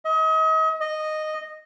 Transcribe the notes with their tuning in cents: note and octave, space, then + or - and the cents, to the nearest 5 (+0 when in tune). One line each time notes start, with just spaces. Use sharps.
D#5 +35
D#5 -10